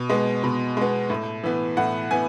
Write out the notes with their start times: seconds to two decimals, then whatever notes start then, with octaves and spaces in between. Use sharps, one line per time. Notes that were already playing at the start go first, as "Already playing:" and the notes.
Already playing: B2
0.09 G#3 B3
0.44 B2
0.77 G#3 B3
1.10 A2
1.44 E3 B3
1.77 A2 F#5
2.11 E3 B3 G#5